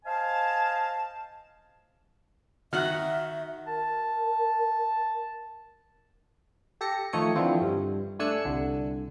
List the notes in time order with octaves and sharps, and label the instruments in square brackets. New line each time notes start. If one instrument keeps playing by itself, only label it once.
[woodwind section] C5 D#5 F5 G#5 A5
[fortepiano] D#3 [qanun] D#4 F#4 F#5 [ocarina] E5 [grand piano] F6 F#6
[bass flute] A#4 [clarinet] A5
[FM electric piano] G4 A4 A#6 C#7
D#3 F3 A3 C#5 D#6 C#7
D3 E3 F3 C4
G2
A3 D4 G#5 E6 F#6 C#7
C2 D3